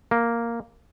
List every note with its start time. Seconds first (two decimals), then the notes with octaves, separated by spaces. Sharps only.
0.11 A#3